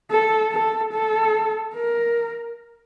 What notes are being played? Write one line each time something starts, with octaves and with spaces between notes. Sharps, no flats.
A4
A4
A4
A#4